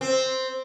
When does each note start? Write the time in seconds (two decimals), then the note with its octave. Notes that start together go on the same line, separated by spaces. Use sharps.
0.01 C4